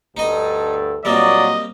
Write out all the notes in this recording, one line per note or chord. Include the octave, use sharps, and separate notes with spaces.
D2 G2 D#4 A4 D#5
A#2 F#3 G3 A#3 C4 D5 D#5